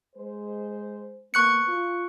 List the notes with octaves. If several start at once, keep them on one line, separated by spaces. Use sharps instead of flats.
G#3 C5
A#3 B3 C#6 F#6 C#7
F4